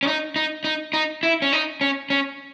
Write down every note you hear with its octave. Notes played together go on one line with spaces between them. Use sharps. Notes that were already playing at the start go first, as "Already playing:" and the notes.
C#4
D#4
D#4
D#4
D#4
E4
C#4
D#4
C#4
C#4